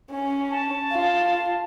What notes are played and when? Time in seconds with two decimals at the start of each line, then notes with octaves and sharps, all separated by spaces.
0.11 C#4
0.51 A5
0.92 F4